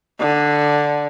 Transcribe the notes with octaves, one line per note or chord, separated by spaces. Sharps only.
D3